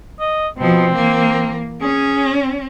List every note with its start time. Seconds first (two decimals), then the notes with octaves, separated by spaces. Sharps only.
0.20 D#5
0.58 B2 F3 C4
0.94 E3 A#3
1.82 C#4 G#4